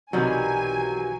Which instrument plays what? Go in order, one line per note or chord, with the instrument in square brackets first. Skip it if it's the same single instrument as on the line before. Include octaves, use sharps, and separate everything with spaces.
[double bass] B1 E3 [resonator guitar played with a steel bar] C3 D#3 G3 [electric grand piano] F#3 [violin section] G#5